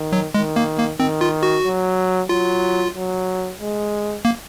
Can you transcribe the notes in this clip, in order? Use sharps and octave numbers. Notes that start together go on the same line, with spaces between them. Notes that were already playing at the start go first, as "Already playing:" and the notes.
Already playing: D#3
F#3
D#3 G#3
A#3
A#3
D#3 C4
F4
F#4
F#3
F#3 F4
F#3
G#3
A#3